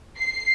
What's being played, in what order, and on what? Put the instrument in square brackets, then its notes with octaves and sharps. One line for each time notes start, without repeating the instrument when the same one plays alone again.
[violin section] C7